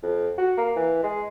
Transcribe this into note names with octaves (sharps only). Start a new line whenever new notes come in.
F2
F#4
A#3
E3
G#3